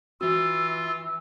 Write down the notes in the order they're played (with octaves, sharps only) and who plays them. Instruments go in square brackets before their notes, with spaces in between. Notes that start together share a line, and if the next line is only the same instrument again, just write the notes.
[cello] E3 [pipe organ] F4 [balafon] F#4 [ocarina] E6